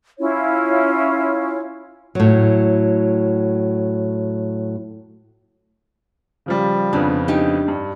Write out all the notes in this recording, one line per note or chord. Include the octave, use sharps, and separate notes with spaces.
C#4 E4 F4 C#5
A2 F#3
C#3 F3 G3
F2 C#3 B3 D4
D4 D#4 G4
G2